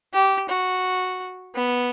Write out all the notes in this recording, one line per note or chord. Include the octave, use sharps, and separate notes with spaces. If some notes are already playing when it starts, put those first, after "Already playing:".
G4
F#4
B3